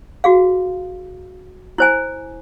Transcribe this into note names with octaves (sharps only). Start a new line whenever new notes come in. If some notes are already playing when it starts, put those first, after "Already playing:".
F#4 G#4 F5
E4 C5 G#5